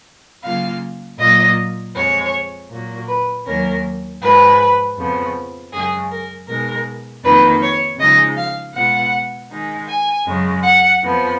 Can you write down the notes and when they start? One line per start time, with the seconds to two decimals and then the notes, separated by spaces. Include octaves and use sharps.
0.43 C#3 F#3 A#3 F4 F5
1.18 A#2 F#3 A#3 F4 D#5
1.95 F2 F3 G#3 C#5
2.70 A#2 F#3 A#3
3.07 B4
3.45 D#2 D#3 F#3 A#3 C#4 A#4
4.21 G#2 F3 G#3 B4
4.96 F2 C#3 F3 B3
5.72 F#2 C#3 G#3 G#4
6.11 A#4
6.48 B2 G#3 D#4 A#4
7.23 F2 D#3 A#3 D#4 B4
7.62 C#5
7.99 C#3 F3 G#3 D#4 D#5
8.37 F5
8.74 B2 G#3 B3 F4 F#5
9.51 D#3 G#3 D#4
9.89 G#5
10.26 F#2 C#3 G#3
10.63 F#5
11.01 F2 F3 B3